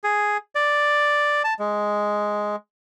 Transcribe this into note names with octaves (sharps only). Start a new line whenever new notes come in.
G#4
D5
A5
G#3